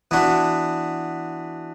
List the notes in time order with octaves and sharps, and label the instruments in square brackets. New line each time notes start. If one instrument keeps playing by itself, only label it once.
[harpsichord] E3 B3 D4 F#4